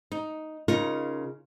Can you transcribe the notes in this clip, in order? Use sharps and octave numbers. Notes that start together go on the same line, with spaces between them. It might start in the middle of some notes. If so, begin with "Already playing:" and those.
D#4
C#3 D#4 F4 A#4